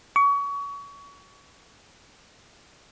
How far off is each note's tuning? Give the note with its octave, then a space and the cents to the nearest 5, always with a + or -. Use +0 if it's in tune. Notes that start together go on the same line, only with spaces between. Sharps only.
C#6 +30